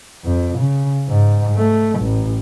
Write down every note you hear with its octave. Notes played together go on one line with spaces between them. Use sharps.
F2
C#3
G#2
A3
A1